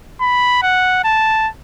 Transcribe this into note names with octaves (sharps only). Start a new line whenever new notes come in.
B5
F#5
A5